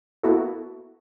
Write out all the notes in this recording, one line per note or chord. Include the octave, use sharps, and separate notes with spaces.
A#3 B3 E4 F#4 A4